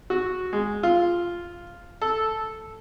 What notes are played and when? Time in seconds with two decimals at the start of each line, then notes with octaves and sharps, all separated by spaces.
0.10 F#4
0.53 G#3
0.83 F4
2.02 A4